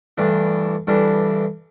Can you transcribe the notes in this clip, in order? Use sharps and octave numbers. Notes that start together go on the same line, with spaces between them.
G2 E3 A3 D4
G2 E3 A3 D4